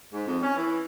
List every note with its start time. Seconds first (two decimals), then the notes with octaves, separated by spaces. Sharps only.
0.12 G#2
0.27 F2
0.43 C#4
0.56 E3